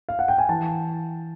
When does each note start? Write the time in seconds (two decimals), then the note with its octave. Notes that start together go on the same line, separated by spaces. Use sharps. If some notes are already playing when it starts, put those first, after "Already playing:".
0.09 F5
0.19 F#5
0.28 G5
0.38 G#5
0.49 E3 A5